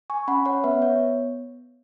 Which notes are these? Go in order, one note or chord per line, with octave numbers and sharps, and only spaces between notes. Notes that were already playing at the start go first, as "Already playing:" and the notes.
G#5 C#6
C#4 F#5 B5
C#5 F#5
B3 B4 E5
C#5